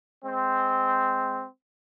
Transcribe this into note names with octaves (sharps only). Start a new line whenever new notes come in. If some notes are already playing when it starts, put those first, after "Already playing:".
G#3 C4